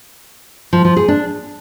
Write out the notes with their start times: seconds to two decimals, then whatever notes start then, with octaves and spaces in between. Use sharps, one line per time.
0.73 F3
0.85 F3
0.96 G#4
1.08 D4